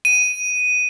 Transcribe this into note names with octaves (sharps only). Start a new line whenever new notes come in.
D#7